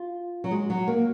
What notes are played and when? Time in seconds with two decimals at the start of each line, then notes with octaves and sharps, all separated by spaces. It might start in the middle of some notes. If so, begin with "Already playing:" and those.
Already playing: F4
0.44 F#3
0.51 G#3
0.70 F#3
0.88 A#3